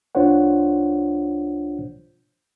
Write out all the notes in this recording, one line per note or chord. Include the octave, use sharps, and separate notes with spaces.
C2 D4 F4 C5 C#5 F#5